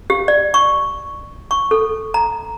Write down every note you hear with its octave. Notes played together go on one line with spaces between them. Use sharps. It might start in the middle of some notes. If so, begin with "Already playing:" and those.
G4
D5
C#6
C#6
A4
A#5